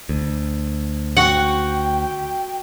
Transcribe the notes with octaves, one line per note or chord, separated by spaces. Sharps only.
D2
F#4 F#5 G5